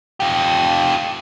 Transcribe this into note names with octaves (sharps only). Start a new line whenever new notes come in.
F4 G4